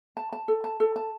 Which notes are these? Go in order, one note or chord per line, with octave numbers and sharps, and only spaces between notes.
A5
A5
A4
A5
A4
A5